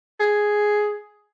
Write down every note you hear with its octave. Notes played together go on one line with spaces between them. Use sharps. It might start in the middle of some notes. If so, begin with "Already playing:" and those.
G#4